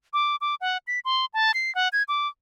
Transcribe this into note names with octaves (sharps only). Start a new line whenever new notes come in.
D6
D6
F#5
B6
C6
A5
C7
F#5
G#6
D6